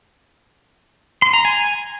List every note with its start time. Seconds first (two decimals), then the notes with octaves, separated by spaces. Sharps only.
1.22 C6
1.33 A#5
1.45 G#5